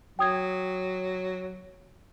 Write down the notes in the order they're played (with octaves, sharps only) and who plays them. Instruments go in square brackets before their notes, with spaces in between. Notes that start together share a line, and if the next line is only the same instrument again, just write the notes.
[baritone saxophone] F#3 [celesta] G5 D#6 G#6